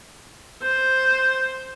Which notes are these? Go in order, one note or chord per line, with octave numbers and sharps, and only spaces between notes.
C5